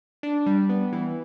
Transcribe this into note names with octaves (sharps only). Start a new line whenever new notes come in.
D4
G3
B3
E3